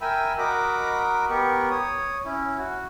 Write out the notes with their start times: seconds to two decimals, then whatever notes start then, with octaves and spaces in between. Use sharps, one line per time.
0.01 A#4 E5 G5 G#5 B5 E6
0.39 F#4 A#4 D#5 A#5 B5 D6
1.30 B3 G4 A#4 C#6
1.70 C#5 D#6
2.25 C#4 E4
2.58 F#4